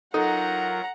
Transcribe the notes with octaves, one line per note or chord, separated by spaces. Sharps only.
F#3 D#4 F4 A4 A#4 F#5 A#5